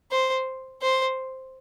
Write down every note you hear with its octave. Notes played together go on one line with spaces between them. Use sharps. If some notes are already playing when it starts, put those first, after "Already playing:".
C5
C5